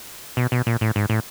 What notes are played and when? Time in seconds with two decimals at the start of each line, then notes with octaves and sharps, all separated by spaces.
0.37 B2
0.52 B2
0.67 A#2
0.81 A2
0.96 G#2
1.10 A2